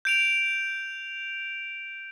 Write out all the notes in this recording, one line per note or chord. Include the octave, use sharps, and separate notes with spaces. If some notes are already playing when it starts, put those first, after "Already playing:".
G6 D7 F7